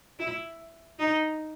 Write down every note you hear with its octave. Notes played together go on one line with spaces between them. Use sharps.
E4
D#4